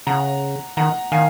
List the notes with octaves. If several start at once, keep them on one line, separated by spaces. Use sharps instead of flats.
C#3 F#5 A#5
D#3 F#5 A#5
D#3 F5 G#5